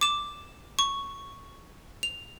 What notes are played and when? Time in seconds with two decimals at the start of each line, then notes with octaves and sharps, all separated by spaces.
0.01 D6 E7
0.79 C#6
2.03 F7